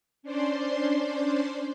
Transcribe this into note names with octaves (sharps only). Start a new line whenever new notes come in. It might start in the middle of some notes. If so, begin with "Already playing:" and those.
C#4 D4 C5 D5 C6